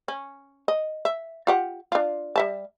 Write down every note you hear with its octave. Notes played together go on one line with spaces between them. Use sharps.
C#4
D#5
E5
F4 G4 F#5
D4 F4
G3 E5 A5